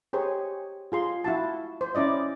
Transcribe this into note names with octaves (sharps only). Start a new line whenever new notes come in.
G4 G#4 C5 C#5
F4 G#4 C6
E4 F#4 A5
C5
C#4 E4 D5 D#5